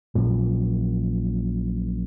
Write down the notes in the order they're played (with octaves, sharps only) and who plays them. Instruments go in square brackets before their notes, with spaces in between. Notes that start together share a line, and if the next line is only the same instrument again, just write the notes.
[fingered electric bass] A#1 F#2 A#2